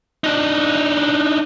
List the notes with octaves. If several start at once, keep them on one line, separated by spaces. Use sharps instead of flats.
D4 D#4